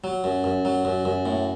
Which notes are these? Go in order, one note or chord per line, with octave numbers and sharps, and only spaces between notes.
F#3
F#2
F#2
F#3
F#2
F#2
A2